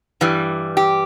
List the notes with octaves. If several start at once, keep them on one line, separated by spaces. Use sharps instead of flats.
G2 E3 G3
G4